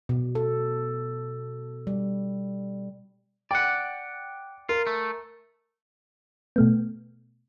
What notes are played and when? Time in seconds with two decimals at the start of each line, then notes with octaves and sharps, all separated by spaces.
0.09 B2
0.35 A4
1.87 G3
3.51 D5 F#5 G5
4.69 F4 A#4
4.87 A3
6.56 B2 A3 B3